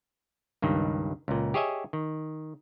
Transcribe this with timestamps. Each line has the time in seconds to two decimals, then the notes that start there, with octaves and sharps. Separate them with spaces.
0.62 C#2 G2 D#3
1.28 C#2 A#2
1.54 G4 G#4 C#5 D#5 E5 G#5
1.93 D#3